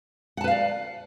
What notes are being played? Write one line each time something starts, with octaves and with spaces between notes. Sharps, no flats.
B4 D5 F5 F#5 A5